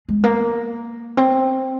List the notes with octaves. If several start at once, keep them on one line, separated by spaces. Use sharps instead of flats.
G#3
A#3
C4